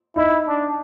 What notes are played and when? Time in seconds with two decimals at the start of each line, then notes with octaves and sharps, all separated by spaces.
0.16 D#4 E4
0.47 D4